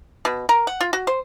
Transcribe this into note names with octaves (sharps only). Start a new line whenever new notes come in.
B2
A#4
F#5
F4
F#4
C5